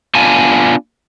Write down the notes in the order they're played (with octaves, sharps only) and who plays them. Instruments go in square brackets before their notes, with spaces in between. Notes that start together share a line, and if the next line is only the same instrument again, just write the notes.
[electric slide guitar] B3 D4 F4 G#5 A5